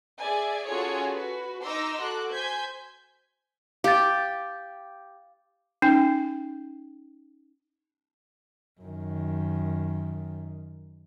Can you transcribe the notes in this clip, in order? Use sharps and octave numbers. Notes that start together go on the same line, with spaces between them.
G#4 D5 E5 G#5
C#4 F4 F#4 G#4 A4 C#5
F#4 B4
D#4 A#5 C6 D6 E6 A#6
F#4 A4 D6 F#6
C5 G#5 G6 G#6 B6
G4 F5 A6
C#4 D#4 G5
F#2 D#3